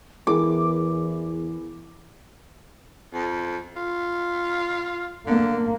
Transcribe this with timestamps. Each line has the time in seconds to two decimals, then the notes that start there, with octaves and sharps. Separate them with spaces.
0.27 E2 E3 E4 G#4 A#4 D6
3.14 F2
3.76 F4
5.27 D3 A#3